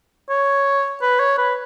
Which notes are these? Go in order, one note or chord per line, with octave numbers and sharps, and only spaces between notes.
C#5
B4
C#5
B4